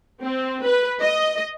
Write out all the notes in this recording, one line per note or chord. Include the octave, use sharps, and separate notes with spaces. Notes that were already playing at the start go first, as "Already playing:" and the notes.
C4
B4
D#5